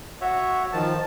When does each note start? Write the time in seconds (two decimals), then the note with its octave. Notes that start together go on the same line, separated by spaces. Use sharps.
0.21 F#4 C#5 E5
0.73 D#3 F3 A5